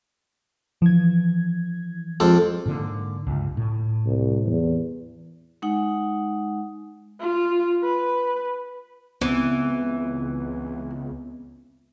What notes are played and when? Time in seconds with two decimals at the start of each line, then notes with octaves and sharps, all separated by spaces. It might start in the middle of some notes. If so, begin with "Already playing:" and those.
0.82 E3 F3 G#6
2.20 F2 G#3 A4 D6
2.66 G#2 D3 A#3
3.27 C#2 G2
3.57 A2
4.06 C2
4.46 E2
5.62 G#3 D#4 F#5
7.20 F4
7.84 B4
9.21 C#2 E3 B3 C4